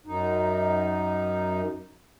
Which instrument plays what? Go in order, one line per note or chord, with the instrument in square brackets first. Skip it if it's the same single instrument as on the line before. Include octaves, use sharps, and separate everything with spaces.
[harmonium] F#2 D#4